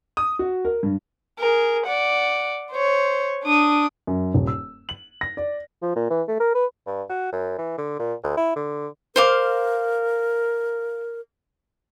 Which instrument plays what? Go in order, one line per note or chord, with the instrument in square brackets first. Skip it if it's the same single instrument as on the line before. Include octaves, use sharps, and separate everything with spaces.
[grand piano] D#6
F#4
A#4
G2
[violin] G#4 A#4
D5 F#5
C5 C#5
D4 D#6
[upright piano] F#2
D#1
E6
F#7
A#6
D5
[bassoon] F3
A#2
E3
A3
A#4
B4
G2
F#4
F#2
E3
D3
A#2
D2
E4
D3
[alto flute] A#4 [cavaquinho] C5 F5 D6